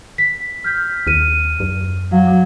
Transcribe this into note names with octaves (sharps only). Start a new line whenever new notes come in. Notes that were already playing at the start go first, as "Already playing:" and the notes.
B6
F6 G6 B6
D#2 F6 D#7
F#2
F#3 F5